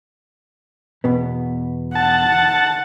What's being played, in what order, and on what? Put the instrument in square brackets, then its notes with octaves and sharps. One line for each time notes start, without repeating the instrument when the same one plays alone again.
[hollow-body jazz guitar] E2 B2 B3
[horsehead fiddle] F#5 [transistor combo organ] A5